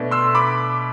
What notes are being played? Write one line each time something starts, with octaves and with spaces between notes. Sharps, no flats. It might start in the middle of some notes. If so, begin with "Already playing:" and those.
Already playing: B2 A3 D4
C6 E6
B5 D6